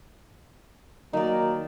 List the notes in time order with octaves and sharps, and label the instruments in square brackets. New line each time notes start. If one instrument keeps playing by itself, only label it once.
[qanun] D#3 D5 [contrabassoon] F#3 [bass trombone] A#3 [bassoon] D#4